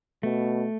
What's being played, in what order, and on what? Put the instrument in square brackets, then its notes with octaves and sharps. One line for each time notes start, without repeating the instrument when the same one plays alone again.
[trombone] B2 [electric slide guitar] A3